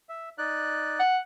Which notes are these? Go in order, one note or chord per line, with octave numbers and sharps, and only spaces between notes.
E5
D#4 D5 F#6
F#5